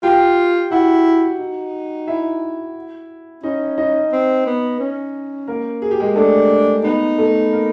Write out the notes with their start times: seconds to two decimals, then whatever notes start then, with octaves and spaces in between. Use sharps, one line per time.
0.03 F4 G4 G5
0.71 E4 F#4 F#5
1.40 D#4
2.07 E4 E5
3.43 C#4 D#4 D#5
3.78 D#4 D#5
4.12 C4
4.46 B3
4.80 C#4
5.48 A#3 A#4
5.82 G#4
5.91 G4
6.00 G#3 G#4
6.16 A3 D4 A4
6.84 B3 D#4 B4
7.18 A3 A4
7.52 A#3 A#4